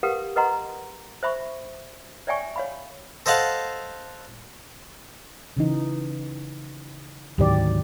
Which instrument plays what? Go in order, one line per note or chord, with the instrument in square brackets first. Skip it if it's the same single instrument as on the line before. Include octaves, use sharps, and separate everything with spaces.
[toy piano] G4 A#4 B4 F5 F#5
A#4 B4 D#5 F#5 A#5 C6
C5 E5 B5 C#6
C#5 D5 E5 G5 G#5 C#6
C#5 F5 B5
[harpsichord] A4 C5 D#5 F5 F#5 A5
[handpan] C#3 E3 D#4
[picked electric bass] D2 G#2 D#3 [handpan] F#3 G4 D5